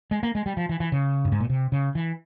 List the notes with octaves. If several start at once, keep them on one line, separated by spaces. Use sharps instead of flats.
G#3
A#3
G#3
G3
F3
E3
E3
C#3
G2
G#2
A#2
C3
C#3
E3